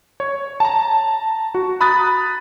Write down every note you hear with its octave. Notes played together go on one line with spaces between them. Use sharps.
C#5
A5 A#5
F#4
A#5 B5 D#6 F#6 A6